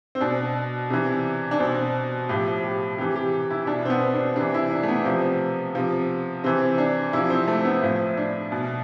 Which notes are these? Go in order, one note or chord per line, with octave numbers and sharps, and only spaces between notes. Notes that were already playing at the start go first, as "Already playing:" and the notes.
C4
B2 D4
C3 E3
D4
B2 C4
A2 F3 G4
G4
C3 E3 G4
G4
E4
B2 D4
C4
B3
D4
C3 E3 D4
E4
D4
A3
B3
C3 F3
C3 F3
C3 E3 C4
D4
C3 F3 E4
C4
A3
B3
A2 F3
D4
B2